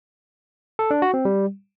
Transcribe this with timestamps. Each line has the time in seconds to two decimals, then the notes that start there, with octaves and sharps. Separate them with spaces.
0.79 A4
0.91 D4
1.02 F#4
1.14 C4
1.25 G3